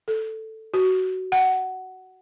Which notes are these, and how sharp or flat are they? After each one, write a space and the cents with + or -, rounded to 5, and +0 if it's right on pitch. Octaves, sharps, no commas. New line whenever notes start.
A4 +5
F#4 +15
F#5 +15